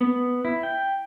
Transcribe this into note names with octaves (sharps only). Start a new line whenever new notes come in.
B3
E4
G5